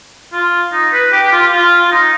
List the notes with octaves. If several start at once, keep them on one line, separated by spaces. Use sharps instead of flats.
F4
D#4
B4
G4
G4
F4
F4
F4
D#4